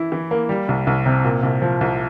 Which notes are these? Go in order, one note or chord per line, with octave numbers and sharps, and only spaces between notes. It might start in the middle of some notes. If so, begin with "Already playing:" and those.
Already playing: E3 E4
E3
A#3
G3
C2
C2
C3
A#2
C2
F3
C2